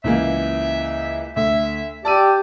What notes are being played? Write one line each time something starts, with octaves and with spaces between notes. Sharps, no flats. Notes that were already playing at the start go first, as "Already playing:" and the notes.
C#2 E3 A#3 E5
D2 E5
G4 D5 A5 E6 D#7